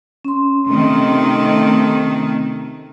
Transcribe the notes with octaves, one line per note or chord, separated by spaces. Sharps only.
C#4 C6
C3 D#3 A3